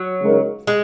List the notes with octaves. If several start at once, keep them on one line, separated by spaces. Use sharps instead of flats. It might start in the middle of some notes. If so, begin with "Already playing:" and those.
Already playing: F#3
C#3 G#3 D#4 A#4
G#3